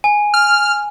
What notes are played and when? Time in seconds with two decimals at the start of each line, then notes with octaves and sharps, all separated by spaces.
0.04 G#5
0.34 F6